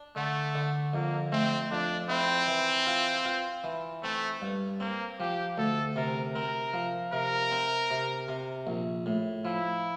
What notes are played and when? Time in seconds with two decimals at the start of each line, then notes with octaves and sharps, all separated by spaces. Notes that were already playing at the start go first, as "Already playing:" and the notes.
Already playing: D4
0.16 D3 A3
0.55 D3
0.94 F2 A#3
1.32 A3 C4
1.71 F2 D4
2.09 C4 E4
2.48 E3
2.86 F4
3.25 F4
3.64 E3
4.03 A3 C4
4.42 G2
4.80 A#3 C4
5.19 F3 G4
5.58 D2 A4
5.96 C3 A#4
6.35 C4 A#4
6.73 F3
7.13 C3 A#4
7.52 C4
7.91 C3
8.28 C3
8.67 A#1
9.06 A2
9.45 F3 E4